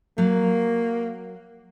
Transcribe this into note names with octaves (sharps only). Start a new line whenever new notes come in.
F#3 A#3